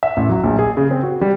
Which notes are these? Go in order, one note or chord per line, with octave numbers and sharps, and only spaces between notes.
E5
A1
F#3
A#1
G#4
C#3
C4
F#4
G3